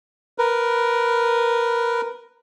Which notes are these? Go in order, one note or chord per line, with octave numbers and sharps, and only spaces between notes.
A#4 B4